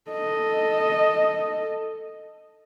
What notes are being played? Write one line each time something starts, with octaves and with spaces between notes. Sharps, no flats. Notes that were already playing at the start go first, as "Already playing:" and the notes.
A4 D#5